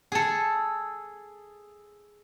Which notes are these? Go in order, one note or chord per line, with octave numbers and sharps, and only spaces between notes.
G#4 A4